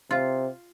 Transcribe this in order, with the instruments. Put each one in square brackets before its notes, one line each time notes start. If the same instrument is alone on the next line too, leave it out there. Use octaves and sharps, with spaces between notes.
[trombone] C3 [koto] F4